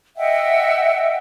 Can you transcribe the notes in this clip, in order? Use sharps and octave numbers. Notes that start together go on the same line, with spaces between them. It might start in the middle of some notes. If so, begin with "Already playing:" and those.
D#5 E5 F#5 G5